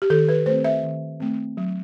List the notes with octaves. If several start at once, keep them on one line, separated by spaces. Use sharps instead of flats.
G4
D#3 A4
B4
A3 C5
C4
E5
D#3
A3 C4
F#3